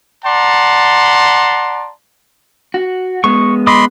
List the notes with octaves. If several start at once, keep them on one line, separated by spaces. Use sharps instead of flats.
D5 F#5 A5 A#5 C6
F#4
G#3 B3 C#6
D#5 B5 C6 D6 D#6